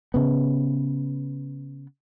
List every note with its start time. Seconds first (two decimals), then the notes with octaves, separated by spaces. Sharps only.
0.14 C#3 B3